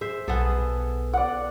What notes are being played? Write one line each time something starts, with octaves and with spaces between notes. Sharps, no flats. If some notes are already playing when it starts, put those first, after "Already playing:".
G#4 C5 E5
B1 B3 G#4 A4
D5 F#5